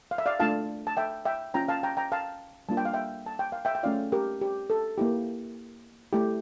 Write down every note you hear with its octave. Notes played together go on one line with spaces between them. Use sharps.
F5
E5
D5 F5
A3 D4 F4 F5 A5
A5
E5 G5
E5 G5
C#4 F4 G5 A#5
F5 A5
G5 A#5
G5 A#5
F5 A5
G3 A#3 D4 F4 A5
G5
F5
E5 G5
A5
G5
F5
E5 G5
G5
A3 C#4 F4 D5 F5
G4 A#4
G4
A4
A#3 E4 G4
A3 E4 G4